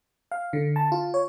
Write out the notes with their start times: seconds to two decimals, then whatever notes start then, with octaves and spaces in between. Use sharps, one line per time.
0.32 F5
0.53 D3
0.76 A5
0.92 F4
1.14 C#5